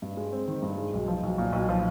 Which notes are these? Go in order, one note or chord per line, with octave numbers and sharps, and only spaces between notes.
G2
G#3
C4
D#3
G2
G#3
B1
F3
B1
A#2
B1
F3